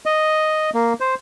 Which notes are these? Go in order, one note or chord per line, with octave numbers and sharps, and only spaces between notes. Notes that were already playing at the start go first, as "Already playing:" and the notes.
D#5
A#3
C5